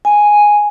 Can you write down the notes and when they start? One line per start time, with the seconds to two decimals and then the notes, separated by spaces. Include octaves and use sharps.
0.05 G#5